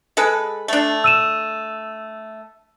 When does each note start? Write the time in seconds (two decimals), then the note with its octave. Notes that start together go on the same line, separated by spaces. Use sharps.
0.17 G#3 A4 B4
0.68 A3 D4
1.04 E6 D#7 E7